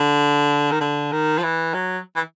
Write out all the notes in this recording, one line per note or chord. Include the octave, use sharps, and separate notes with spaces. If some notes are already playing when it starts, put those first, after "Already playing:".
Already playing: D3
D#3
D3
D#3
F3
E3
F#3
E3